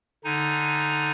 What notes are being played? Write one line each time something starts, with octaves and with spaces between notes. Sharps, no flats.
D3 D#4 G#5